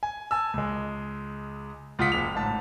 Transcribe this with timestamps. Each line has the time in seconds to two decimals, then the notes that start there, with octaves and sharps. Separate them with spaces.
0.03 G#5
0.31 G#5 A5 E6
0.54 C#2 G#3
1.99 C#2 F4 F#5 D#6 B6 C#7
2.12 F#1 F7
2.35 A1 G#2 A5